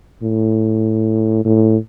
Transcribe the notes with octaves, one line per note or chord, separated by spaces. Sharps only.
A2
A2